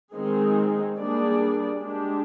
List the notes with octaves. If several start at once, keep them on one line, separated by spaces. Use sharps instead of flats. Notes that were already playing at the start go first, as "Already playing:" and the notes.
D#3 G#3 C4 D#4 G#4
G3 A#3 D4 G#4 D5
G#3 D4 G4